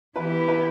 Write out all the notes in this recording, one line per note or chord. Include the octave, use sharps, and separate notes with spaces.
E3 B3 E4 G4 B4
B4